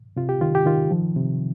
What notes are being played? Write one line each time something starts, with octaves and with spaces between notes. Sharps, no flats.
C3 F4
G4
D#3 F4
G4
D#3 F4
F3
C3